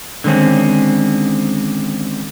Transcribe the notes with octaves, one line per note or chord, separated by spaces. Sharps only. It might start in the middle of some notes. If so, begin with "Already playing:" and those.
D3 D#3 G#3 C4 C#4